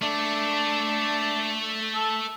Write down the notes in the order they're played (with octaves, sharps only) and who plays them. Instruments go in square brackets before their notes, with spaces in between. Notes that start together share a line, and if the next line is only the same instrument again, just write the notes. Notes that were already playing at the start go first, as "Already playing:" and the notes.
[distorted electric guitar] A3 [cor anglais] D4
[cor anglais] A4